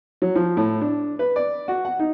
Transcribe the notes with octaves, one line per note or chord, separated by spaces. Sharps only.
F#3
F3
A2
D4
B4
D5
F#4
F#5
D#4